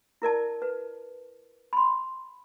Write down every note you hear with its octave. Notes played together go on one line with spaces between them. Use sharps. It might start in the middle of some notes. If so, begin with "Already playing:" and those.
E4 A#4 D5 A5
B4
B5 C6